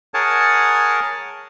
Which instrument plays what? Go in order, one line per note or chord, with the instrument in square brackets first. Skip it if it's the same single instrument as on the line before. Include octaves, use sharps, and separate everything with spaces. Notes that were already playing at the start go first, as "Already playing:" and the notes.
[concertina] G#4 A#4 C#5 F#5 G#5 A5